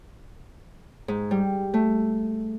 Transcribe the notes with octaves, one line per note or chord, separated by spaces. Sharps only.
G#2
G3
A3